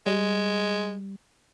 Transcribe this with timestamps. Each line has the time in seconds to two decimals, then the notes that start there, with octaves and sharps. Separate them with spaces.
0.06 G3 G#3